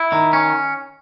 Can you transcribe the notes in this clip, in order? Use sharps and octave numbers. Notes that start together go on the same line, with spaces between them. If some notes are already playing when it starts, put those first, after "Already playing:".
Already playing: E4
D#3
C#4